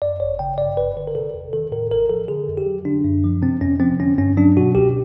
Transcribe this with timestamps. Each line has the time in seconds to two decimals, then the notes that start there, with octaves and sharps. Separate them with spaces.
0.02 F#2 D5
0.20 G#1 C#5
0.39 C#3 G5
0.58 G2 D5
0.77 G1 B4
0.97 D3 B4
1.07 A#4
1.15 C3 A4
1.34 E2
1.53 D#3 A4
1.72 A2 A#4
1.90 A1 A#4
2.10 F3 A4
2.28 D3 G#4
2.48 F2
2.57 G4
2.67 F#3
2.85 D3 D4
3.04 F#2
3.24 F3
3.42 C3 C4
3.61 F2 C#4
3.80 F3 C4
3.99 D3 C#4
4.18 G2 C#4
4.37 F#3 D4
4.57 B2 F#4
4.75 C#2 G4